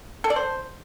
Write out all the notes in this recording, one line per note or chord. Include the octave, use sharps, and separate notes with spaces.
A4
D5
C5